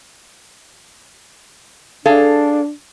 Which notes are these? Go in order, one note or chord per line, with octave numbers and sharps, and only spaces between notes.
D4 G#4 A4 F5